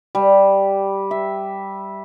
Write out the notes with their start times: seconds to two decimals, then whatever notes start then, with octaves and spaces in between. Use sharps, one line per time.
0.15 G3
1.11 E5